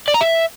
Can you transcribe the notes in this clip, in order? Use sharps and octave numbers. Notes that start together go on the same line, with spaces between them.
D5
A#5
E5